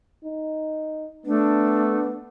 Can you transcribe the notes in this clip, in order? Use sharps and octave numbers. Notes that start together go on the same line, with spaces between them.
D#4
A3 B3 D4